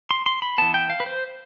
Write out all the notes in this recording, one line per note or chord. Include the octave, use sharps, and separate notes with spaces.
C6
C6
B5
E3 B3 A5
G5
F5
B4
C5